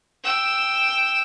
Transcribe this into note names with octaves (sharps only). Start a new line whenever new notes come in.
G5 E6